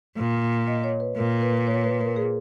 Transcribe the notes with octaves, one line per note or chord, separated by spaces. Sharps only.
A#2
D#5
C#5
B4
A#2 A#4
B4
C#5
B4
A#4
G#4